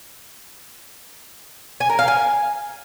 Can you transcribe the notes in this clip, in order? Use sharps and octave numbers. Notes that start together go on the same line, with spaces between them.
G#5
A#4
F5
G#5